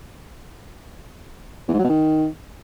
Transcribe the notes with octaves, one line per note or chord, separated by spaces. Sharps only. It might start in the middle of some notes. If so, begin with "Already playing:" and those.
E2
G#2
F#3
B2
D#3